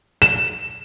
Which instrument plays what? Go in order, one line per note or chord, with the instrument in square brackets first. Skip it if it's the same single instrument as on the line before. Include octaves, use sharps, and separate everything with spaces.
[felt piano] E7